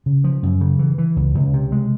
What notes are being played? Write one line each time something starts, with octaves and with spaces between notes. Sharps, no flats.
C#3
F3
F#2
C#3
E3
E3
C#2
C#2
C3
G#3